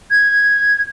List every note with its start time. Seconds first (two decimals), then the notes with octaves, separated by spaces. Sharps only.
0.11 G#6